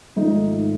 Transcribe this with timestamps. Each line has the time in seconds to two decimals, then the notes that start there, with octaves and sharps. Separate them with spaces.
0.16 G#1 G#2 F3 A3 D#4